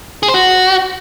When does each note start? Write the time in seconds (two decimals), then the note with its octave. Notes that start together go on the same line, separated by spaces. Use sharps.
0.23 G#4
0.28 C5
0.34 F#4